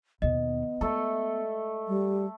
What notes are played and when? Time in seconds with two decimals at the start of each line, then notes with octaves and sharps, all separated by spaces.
0.22 D#2 B2 B3 D#5
0.81 G#3 A3 A4
1.88 G3